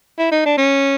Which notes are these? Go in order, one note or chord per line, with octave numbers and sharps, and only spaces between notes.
E4
D#4
D4
C#4